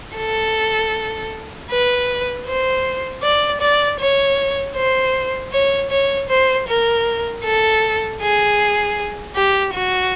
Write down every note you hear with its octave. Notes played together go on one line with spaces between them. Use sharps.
A4
B4
C5
D5
D5
C#5
C5
C#5
C#5
C5
A#4
A4
G#4
G4
F#4